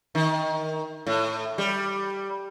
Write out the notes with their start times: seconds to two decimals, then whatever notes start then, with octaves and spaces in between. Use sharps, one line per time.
0.15 D#3
1.07 A2
1.58 G3